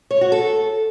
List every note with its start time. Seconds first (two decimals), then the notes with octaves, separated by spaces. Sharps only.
0.11 C#5
0.21 F#4
0.32 A4